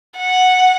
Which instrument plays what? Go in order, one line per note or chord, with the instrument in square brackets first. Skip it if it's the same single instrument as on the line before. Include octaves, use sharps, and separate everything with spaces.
[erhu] F#5